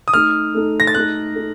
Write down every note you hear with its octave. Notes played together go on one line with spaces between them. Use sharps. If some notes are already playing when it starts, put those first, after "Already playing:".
D#6
A3 D#4 A4 F6
A3 D#4 A4
A#6
A6
A3 D#4 A4 F#6
D#4 A4